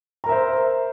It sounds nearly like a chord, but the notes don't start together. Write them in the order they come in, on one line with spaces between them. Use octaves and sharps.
A#5 A#4 E5 C5